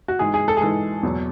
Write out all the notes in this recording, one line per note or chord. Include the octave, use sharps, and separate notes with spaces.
F#4
G#2 E3 G#3 G#4
G#4
A4
G#4
G#2 E3 G#3 A4
E2 B2 F#3